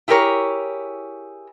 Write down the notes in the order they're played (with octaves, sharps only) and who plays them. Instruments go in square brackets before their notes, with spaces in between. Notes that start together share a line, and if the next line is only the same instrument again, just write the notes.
[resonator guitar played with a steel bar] E4 G4 G#4 A#4 C#5